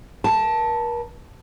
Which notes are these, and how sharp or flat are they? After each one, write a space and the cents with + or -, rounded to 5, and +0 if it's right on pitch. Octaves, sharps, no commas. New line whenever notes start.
A#4 +40 A5 +0